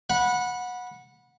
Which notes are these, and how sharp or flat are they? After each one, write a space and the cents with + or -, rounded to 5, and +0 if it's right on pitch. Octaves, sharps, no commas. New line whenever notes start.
F#5 -20 B5 -15